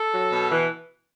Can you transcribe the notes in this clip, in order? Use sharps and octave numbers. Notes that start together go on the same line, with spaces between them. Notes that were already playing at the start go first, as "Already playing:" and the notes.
Already playing: A4
F#3
B2
E3